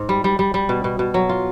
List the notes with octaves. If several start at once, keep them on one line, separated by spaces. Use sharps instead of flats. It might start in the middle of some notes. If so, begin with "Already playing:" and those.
Already playing: G#2
G3
G3
G3
G3
B2
B2
B2
F#3
F4